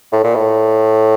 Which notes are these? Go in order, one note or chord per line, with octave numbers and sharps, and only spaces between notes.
A2
A#2
A2